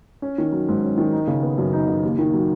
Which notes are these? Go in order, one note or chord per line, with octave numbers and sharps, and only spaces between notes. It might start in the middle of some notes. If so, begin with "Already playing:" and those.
C#4
D#3
F#3
G#2
C#4
D#3
D#4
C#3
B3
F#2
D#4
C#3
D#2
D#3
F#3